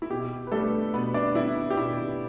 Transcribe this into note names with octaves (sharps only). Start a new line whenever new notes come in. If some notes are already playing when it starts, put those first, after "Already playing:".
E4
B2 G4
B4
G3 A3 D4 A4
B2 B3 B4
D4 D5
G3 D4 E4 E5
G4
B2 E4